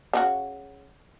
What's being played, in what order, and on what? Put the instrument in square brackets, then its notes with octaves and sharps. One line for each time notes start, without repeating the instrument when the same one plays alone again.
[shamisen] C#3 D4 F#4